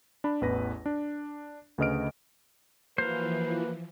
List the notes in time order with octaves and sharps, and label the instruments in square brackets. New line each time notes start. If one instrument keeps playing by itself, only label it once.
[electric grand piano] D4 B5
A1 E2 B4 A#6
D4
D2 C#3 B4 D#5 F6 D7
[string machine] E3 F3 [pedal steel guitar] A#3 F#4 F5 [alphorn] B4 [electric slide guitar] C5